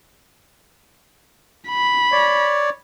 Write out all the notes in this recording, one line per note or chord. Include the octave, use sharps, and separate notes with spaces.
B5
C#5 D5